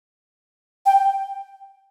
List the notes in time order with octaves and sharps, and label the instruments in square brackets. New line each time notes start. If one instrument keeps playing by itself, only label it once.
[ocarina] G5